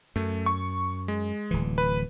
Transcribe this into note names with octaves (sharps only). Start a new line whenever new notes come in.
F#2 A3
C#6
G#3
D1 E3
B4